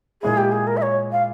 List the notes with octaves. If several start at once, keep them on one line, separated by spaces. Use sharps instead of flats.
A#2 G#3 E4 G#4
G4
G#4
A#4
E5
C#5
F5